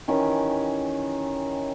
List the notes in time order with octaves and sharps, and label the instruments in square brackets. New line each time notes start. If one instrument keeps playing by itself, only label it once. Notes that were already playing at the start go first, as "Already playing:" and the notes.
[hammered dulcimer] D#3 E3 C#4 G4